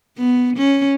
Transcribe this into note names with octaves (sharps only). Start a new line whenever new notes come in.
B3
C#4